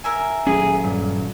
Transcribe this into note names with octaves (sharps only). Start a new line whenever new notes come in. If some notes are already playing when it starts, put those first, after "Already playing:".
A#4 E5 G#5
D#1 F#3 C#4 G#4
G2